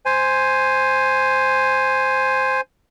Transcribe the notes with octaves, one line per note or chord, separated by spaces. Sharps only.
C5 G#5